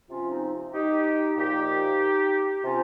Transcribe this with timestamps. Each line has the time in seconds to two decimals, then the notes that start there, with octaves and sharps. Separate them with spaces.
0.08 C3 F3 C#4 F4
0.30 C4 D#4
0.73 D#4 G4
1.36 A#2 F3 D#4 G4
2.64 C3 C#4 F4